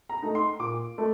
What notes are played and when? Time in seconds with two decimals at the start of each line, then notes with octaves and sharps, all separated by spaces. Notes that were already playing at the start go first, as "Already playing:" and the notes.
0.10 A#5
0.23 A3 D#4
0.35 C6
0.60 A#2 D6
0.98 A3